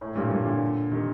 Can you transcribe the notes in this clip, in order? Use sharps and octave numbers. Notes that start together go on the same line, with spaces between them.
A2
G2 A#2
G2 A#2
A#2 D3
C3 D#3